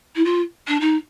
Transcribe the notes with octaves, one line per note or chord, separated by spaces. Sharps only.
E4
F4
D4
D#4